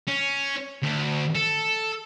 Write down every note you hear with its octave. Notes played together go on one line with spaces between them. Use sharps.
C#4
D2
A4